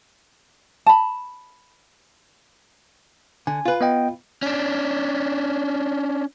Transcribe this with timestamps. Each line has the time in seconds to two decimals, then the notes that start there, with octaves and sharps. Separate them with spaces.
0.86 A5 B5
3.47 D3 G#5
3.65 F4 B4
3.81 B3 D#5 G5
4.43 C#4 D4